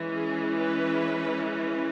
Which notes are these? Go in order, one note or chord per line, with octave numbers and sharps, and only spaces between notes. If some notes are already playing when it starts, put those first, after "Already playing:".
Already playing: E3 G#3 C#4
G#4
B4
B4